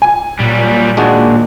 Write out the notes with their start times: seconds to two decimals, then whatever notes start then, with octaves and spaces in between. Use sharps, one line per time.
0.02 G#5
0.40 A#2 F#3 G3
0.97 D#2 G#3 D4 F#4